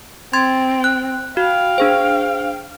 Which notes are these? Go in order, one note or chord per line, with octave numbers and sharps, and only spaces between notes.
C4 C6 G#6 A6
F#6
F#4 F5 G5
D4 G#4 C5